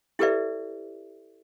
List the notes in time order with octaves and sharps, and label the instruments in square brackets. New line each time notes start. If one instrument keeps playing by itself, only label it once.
[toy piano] E4 G4 A4 B4 D5 E5